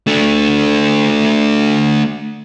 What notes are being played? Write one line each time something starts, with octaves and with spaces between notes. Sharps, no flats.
A3 D4